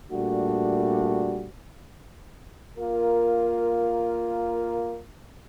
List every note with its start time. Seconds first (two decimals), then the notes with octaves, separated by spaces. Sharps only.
0.11 A#2 G3 A3 D4 F#4
2.77 A#3 F4 A#4